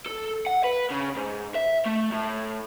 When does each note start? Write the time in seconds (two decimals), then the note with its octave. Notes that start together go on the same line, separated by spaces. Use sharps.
0.06 A4
0.47 F#5
0.64 B4
0.90 C#3
1.16 G#2
1.55 E5
1.85 A3
2.12 A2